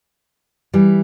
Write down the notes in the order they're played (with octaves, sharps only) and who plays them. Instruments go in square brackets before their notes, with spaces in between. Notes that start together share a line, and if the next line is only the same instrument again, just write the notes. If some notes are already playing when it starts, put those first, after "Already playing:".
[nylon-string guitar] E3 G3